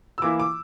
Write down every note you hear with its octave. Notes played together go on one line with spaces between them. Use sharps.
E6
E3 A#3 E4 D6
D6